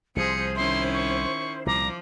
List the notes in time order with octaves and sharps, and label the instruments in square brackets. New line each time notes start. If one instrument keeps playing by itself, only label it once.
[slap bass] C2 [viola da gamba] F3 G#4 [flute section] C5 [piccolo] C#7
[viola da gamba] D#3 C#4 E4 [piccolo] C6
[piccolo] C#6
[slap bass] C2 A#2 [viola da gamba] F3 [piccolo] A#5 [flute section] D6